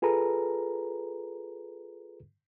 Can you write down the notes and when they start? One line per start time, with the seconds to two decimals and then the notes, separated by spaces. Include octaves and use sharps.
0.02 F4 G#4 A4 B4 A#5